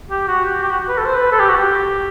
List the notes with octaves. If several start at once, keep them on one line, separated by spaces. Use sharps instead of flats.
G4
F#4
G4
G4
F#4
B4
A4
C5
B4
A4
G4
F#4
G4